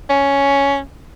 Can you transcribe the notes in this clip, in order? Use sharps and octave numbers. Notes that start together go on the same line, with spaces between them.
C#4